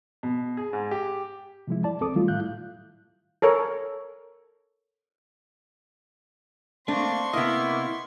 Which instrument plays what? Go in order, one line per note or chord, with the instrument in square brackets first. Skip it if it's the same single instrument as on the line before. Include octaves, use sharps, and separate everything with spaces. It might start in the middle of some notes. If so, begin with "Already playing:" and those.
[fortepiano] B2
G#4
G#2
G4
[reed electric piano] C3 F3 G#3 E4
D5 A5
C2 C4 A4 D6 D#6
D#3 F#3 G3 A3 E4 F4
A2 E4 F5 F#6 G6
[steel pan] A4 A#4 C#5
[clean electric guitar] A3 A#3 [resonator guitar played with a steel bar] C4 D4 [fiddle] C6 C#6
[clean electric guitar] C3 D#5 [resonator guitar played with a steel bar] A#3 B3 [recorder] E4